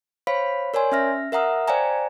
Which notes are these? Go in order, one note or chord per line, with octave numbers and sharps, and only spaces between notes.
C5 C#5 F5 B5 B6
A#4 C#5 D5 G#5 C6
C#4 E5 F6 A#6
A#4 E5 F#5 A#5 D#6 F6
C5 D5 F5 G5 G#5 A#5